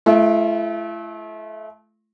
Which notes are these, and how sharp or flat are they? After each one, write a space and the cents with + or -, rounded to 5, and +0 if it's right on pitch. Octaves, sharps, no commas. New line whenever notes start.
A3 -30 E4 +45